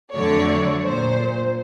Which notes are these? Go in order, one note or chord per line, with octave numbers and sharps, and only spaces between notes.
F2 D3 F#3 A3 C#5 D5
A#2 C5